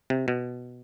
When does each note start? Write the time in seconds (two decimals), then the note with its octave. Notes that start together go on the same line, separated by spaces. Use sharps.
0.10 C3
0.28 B2